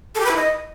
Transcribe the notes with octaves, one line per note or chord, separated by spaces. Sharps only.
A4
G4
B4
E4
D#5